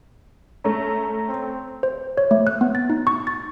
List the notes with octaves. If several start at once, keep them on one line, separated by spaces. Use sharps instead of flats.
A3 C#4 A#5
C4
C5
C#5
A3
F#6
B3
A6
D#4
C#6
A6